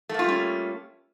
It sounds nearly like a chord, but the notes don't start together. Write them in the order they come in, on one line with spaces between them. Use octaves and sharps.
A3 A#3 F4 G3 C#4